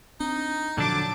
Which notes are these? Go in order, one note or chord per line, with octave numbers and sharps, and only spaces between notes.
C4 D4 D#4
A#2 D3 F3 F#3 D4 A5 D6